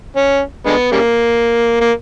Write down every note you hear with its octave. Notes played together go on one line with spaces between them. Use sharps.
C#4
D3 G#3 B3
C#3 G3 A#3
A#3